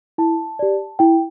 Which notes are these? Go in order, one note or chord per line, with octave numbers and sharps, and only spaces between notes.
E4 A5
G4 D5
E4 G5